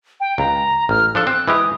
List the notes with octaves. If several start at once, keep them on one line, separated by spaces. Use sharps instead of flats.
G5
C#2 A#5
A1 F6
F3 D4 A4 F#6
C4
E3 G#3 G4 D#6